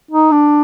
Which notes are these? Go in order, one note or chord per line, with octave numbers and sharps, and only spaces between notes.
D#4
D4